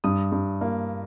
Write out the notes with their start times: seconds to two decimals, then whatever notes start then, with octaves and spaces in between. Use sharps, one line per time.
0.04 G2 D#6
0.32 G2
0.61 A#3